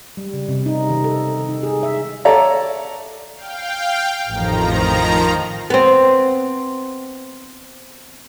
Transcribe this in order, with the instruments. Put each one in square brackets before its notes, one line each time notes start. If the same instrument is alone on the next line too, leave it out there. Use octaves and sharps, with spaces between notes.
[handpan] G3
C#3
C3
D#4
D#3
A4
D#4
G#4
E5
[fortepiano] A4 C#5 D5 E5 A#5
[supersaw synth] F5 G5
[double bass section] A1 F2 A2 [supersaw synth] D#3 F3 A#5
[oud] B3 C4